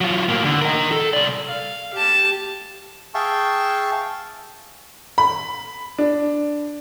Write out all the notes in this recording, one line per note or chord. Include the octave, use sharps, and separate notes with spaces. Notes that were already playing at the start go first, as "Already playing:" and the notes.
F#3 F4
A2 A#3
E2 D3
A#4 D#5
A4
C2 D5
F5
G4 A5
G#4 E5 F5 G5 A5 C#6
B5
D4